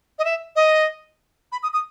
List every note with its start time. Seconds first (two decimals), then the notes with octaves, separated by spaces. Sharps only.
0.19 D#5
0.25 E5
0.56 D#5
1.52 B5
1.63 D#6
1.73 D#6